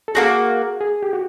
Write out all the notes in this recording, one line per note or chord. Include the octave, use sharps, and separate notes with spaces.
A4
A#3 D4 F#4 G#4
G#4
G4
F#4